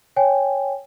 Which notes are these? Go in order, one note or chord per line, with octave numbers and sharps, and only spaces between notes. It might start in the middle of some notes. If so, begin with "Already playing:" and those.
C#5 G5 G#5